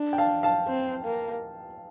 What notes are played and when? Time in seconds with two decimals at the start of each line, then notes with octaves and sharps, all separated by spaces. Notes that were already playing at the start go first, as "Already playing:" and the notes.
Already playing: D4
0.13 G5
0.18 F5 A5
0.43 F5 A5
0.68 C4
1.05 A#3